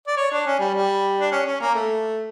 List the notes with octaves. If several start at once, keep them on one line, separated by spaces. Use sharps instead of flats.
D5
C#5
D4
C#4
G3
G3
D4
C#4
C#4
A#3
A3